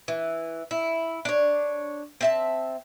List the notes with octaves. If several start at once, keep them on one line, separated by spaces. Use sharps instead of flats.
E3
E4
D4 C#5
C4 E5 A5